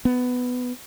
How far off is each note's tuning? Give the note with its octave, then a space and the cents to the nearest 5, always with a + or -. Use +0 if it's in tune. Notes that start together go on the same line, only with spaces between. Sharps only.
B3 +10